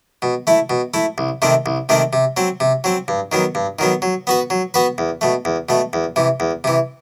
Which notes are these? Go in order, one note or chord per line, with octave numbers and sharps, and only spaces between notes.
B2
A3 E4
B2
A3 E4
C2
C3 D#3 A3 C4
C2
C3 D#3 A3 C4
C3
F#3 C4
C3
F#3 C4
G2
D#3 F#3 B3
G2
D#3 F#3 B3
F#3
B3 F#4 B4
F#3
B3 F#4 B4
E2
B2 A3
E2
B2 A3
E2
C3 E3
E2
C3 E3